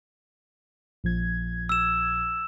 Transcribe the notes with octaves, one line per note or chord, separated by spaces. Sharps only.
A#1 F3 G#6
E6 E7